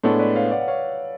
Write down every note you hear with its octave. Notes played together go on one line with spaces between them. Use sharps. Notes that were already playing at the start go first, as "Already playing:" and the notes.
A2 G#3 B3 D4 A4 C#5
B4 D5
C#5 F5
D5 F#5
F#5
C#5 F5